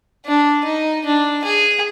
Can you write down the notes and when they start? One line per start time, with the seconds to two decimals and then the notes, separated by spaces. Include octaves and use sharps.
0.26 D4
0.65 D#4
1.05 D4
1.45 G#4